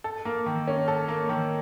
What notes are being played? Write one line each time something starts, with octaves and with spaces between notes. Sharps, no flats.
A4
A#3
D#3
C#4
A4
A#3
D#3